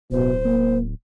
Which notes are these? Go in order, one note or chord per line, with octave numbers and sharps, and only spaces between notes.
D1 B2 C5
A#3